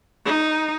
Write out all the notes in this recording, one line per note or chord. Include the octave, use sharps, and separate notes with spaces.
D#4